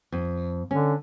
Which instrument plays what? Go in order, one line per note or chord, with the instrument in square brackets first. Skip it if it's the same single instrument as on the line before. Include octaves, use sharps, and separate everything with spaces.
[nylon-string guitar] F2
[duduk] D3 [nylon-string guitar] C#4